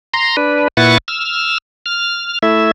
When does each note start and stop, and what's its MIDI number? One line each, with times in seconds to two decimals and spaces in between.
0.14 0.36 82
0.14 0.36 84
0.37 0.68 62
0.37 0.68 71
0.77 0.98 46
0.77 0.98 64
0.77 0.98 71
0.77 0.98 78
0.77 0.98 85
0.77 0.98 93
1.08 1.58 88
1.08 1.58 89
1.86 2.39 89
2.43 2.71 57
2.43 2.71 64
2.43 2.71 76